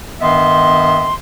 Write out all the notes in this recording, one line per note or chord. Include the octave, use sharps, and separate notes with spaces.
G2 D#3 B3 D#5 E5 C6